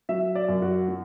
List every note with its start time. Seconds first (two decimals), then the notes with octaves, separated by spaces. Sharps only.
0.09 F#3 E5
0.35 D5
0.48 F#2
0.62 F#4
0.89 F#3